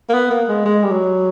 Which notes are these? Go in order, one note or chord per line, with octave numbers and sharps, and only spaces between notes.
A#3
B3
A#3
G#3
G#3
G3
F#3